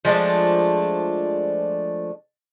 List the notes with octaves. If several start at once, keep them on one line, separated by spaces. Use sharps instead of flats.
F3 G#3 A3 D4